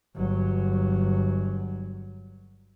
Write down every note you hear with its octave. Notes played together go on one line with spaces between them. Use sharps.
G1 F#3